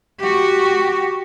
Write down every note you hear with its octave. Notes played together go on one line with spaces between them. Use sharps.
F#4 G4